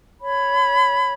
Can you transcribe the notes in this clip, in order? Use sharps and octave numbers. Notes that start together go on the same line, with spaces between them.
C#5 B5